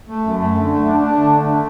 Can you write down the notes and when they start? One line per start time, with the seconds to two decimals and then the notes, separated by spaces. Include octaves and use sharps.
0.09 A3
0.24 F#2
0.39 A3
0.55 D3
0.70 A3
0.85 D4
1.00 D4
1.16 D3
1.32 A3